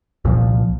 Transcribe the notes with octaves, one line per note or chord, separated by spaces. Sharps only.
C2 A#2 F3